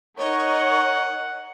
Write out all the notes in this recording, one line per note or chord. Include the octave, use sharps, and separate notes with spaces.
D#4 A#4 C#5 D#5 F#5